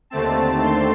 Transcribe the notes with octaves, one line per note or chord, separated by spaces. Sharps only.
D#2 D3 A3 C4 A5
C6